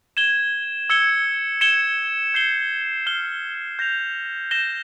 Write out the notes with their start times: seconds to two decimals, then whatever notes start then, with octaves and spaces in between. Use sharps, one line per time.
0.17 G#6 E7 G7
0.90 E6 G#6 C#7 G7
1.61 G#6 C#7 E7 G7
2.34 G6 C7 G7
3.07 F6 C7 G7
3.79 G6 A#6 F7
4.51 G6 A#6 E7 G7